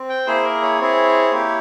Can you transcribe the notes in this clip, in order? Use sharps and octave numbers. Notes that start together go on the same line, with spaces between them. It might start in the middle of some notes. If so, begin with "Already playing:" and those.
Already playing: C4
G5
A#3 E4 G#4 C5
A#4
C#5
C4 E4 G#4
A#3 E4 G4